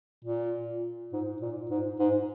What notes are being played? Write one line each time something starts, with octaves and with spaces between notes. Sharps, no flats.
A#2
G#2
A#2
G#2
G#2